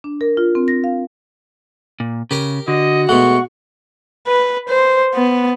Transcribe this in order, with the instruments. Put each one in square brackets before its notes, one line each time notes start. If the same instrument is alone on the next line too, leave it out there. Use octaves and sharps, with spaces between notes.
[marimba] D4
A#4
F4
C4
A#6
F5
[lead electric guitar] A#2
[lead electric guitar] C#3 [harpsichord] G4 A#4 A#5
[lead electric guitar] D3 [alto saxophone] F#4 [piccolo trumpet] D#5
[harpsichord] B2 G#3 A3 [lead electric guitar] F#5 [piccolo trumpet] C#6
[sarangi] B4
C5
B3